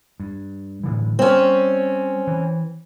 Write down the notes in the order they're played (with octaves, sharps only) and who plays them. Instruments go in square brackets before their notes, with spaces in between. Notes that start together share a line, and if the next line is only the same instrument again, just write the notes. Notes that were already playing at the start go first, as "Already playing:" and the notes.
[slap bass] G2
A2 D3 E3
[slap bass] G3 [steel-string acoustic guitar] C4 C#4
[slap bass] E3